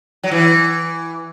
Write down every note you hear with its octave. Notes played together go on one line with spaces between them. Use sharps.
F#3
E3